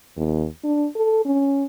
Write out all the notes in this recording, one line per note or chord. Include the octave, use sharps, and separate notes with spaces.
D#2
D4
A4
C#4